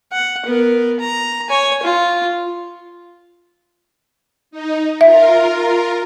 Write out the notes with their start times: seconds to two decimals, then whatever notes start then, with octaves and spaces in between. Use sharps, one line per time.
0.12 F#5
0.46 B3 A#4
1.00 A#5
1.50 C#5 G#5
1.83 F4
4.51 D#4
5.01 F4 A#4 E5